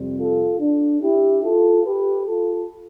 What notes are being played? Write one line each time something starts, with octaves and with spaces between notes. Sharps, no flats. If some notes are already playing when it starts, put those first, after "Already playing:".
Already playing: F2 C3 G3 C4
F4 A4
D4
E4 G4
F4 A4
G4 B4
F4 A4